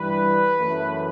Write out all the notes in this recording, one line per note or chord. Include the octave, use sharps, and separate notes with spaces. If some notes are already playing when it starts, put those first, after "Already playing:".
Already playing: G2 E3 G3 B4
F#2 E3 A3